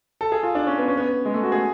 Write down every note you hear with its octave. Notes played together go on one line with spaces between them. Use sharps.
A4
G#4
F4
D4
C#4
B3
C#4
B3
G#3
A3
F#4
G#4